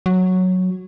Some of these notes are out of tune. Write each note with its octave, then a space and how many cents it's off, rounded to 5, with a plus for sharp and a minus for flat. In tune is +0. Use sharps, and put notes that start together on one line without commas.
F#3 -5